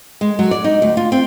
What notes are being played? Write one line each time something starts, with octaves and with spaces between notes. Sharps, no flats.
G#3
F#3
D5
D#4
D2
F4
C4